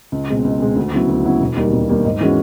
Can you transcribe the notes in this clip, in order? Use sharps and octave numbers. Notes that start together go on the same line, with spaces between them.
C#2
B2 G#3 C4
C#2
B2 G#3 C4
D2
C#3 F#3 B3 E4
D2
C#3 F#3 B3 E4
E1
D#2 D#3 G3 A#3
E1
D#2 D#3 G3 A#3
G#2
E3 G#3 C#4 F#4